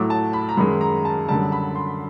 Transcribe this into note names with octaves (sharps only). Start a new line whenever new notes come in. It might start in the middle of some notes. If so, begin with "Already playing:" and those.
Already playing: A2 F#3 A3 D6
A5
B5
A#5
F#2 D#3 G#3 B5
A#5
A5
F#2 D3 G3 A5
B5
C6